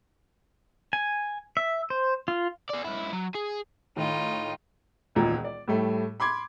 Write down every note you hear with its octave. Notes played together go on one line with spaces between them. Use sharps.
G#5
E5
C5
F4
G#4 D5
C#2 E4
F#3
G#4
A2 D#3 D#4 F4
E1 C#2 A#2 D#3
D5
A2 G3 A3
B5 C6 D6 G#6